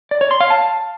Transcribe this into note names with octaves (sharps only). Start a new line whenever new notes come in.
D5
C#5
C6
F5
A5